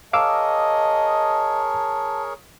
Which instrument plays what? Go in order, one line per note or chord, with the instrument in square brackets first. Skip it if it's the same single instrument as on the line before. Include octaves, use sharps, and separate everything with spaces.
[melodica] G#4 A#4 C#5 [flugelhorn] D#5 [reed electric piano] F5 D6 E6 [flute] A5